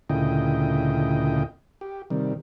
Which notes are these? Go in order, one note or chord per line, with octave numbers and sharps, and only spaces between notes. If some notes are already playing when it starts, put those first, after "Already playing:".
D2 A#2 C#3 E4 D#5 G5
G4
C3 D#3 G3